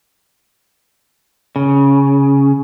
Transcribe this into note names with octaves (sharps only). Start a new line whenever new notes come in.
C#3